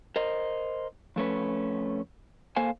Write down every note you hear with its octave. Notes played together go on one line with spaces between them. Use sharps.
A#4 C5 D#5
F2 A3 C#4 B4
A#3 A4 C5 F5 G#5